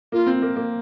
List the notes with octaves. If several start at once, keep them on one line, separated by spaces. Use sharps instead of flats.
A#3 F4
C4
A#3
A#3